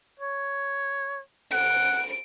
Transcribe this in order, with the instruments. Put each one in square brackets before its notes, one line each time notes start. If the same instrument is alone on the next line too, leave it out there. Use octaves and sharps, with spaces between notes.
[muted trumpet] C#5
[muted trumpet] F#5 [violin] D7